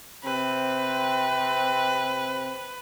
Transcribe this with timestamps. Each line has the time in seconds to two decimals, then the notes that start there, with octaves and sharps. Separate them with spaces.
0.25 C3 C4 B4